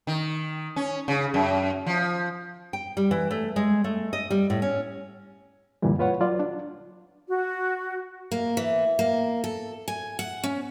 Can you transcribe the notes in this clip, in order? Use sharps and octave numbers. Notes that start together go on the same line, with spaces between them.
D#3
C#4
C#3
F#2
F3
G5
G3
E3
A3
G#3
A3
D#5
G3
A2
C#4
F#2 A#2 D3 E3 G3
F4 B4 C#5 F#5
F#3 F4 D5
D4
F#4
A#3
E3
A#3
A4
G#5
F#5
C#4